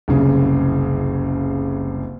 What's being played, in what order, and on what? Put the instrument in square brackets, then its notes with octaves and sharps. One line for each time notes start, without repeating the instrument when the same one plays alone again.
[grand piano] F#1 C2 C#3